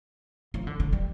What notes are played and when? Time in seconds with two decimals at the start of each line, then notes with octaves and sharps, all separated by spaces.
0.54 F3
0.67 D3
0.80 D3
0.93 G3